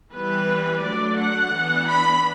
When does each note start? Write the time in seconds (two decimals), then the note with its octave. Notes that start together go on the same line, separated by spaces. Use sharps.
0.13 E3 G3 B3 B4
0.83 F#3 A3 D4 D5
1.18 F#5
1.53 E3 B3 D4
1.89 B5